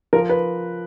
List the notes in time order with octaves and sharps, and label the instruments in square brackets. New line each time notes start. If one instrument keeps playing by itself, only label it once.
[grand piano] F3 A#4
B4